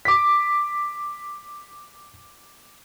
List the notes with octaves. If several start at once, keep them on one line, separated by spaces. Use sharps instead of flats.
D6 B6